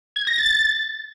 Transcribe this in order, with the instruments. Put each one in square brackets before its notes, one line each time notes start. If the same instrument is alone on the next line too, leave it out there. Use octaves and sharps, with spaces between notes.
[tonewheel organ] G#6
A#6
A6